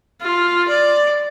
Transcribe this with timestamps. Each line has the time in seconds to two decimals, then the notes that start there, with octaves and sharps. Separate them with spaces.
0.22 F4
0.68 D5